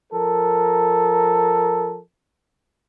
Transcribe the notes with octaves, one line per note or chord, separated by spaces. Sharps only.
F3 A4 A#4